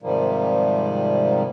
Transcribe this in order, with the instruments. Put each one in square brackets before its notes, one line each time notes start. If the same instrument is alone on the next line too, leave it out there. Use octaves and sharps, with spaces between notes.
[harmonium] G#2 C3 D#3 F3 G3 A#3